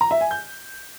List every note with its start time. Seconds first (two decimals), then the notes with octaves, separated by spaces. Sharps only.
0.01 A#5
0.11 E5
0.21 G#5
0.31 G6